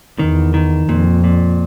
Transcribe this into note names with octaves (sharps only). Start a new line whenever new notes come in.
E2 D#3
D#3
F2 A#2
A#2